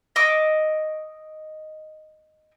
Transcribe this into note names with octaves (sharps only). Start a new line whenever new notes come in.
D#5 C#6 D6 E6